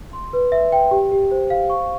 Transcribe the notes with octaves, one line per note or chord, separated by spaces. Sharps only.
C6
B4
E5
G5
G4
G4
C5
F5
C#6